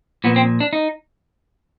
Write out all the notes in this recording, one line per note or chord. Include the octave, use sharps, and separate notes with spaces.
A#2 F3 B3
C4
D4
D#4